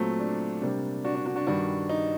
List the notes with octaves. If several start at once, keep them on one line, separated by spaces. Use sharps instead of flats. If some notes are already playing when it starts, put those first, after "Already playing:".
Already playing: A#2 F#3 A3 C4
D4
C3 G3 A#3 D4
D4 F#4
D4
D4 F#4
D4 F#4
G2 D#3 G3 D4 F#4
D#4